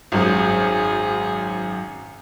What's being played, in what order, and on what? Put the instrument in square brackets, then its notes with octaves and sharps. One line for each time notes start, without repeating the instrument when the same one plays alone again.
[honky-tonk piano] G#1 F#2 [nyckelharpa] G#4